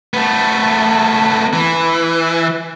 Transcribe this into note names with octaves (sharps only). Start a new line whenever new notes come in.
A3 B3
E3